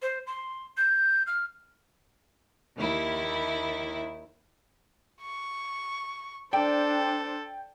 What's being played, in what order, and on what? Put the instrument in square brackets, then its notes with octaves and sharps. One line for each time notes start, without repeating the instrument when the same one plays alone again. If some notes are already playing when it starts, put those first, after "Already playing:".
[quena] C5
C6
G6
F6
[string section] D#2 E4
[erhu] C#6
[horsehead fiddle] D4 C5 [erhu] A4 [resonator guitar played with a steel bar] D5 [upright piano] G5